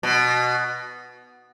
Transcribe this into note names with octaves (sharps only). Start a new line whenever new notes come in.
B2